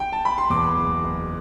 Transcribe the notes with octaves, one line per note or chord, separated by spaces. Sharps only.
G5
A5
B5
C6
E2 D6
F#1
F#1